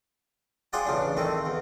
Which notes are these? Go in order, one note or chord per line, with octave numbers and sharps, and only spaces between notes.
F4 G#4 C5 D5 F#5 G5
A1 C#3 D4
D#3 A3 C4
E2